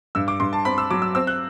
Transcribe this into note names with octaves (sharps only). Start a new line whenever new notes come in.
G2 E6
D6
G2 C6
A5
C4 B5
E6
F#3 D6
E6
C4 E6
F#6